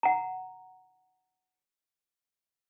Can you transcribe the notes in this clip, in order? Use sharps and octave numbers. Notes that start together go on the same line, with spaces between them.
F#5 A#5